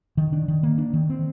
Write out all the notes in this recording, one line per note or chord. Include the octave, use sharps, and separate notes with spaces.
D#3
D4
D#3
A#3
D4
D#3
C4